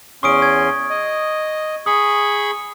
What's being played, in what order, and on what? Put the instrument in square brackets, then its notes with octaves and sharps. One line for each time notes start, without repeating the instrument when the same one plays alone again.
[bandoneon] E2 C#4 C6 [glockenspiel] C#6 D#6 D7
[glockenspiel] G#6
[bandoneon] D#5
[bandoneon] G#4 B5 C#6 [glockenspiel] D#6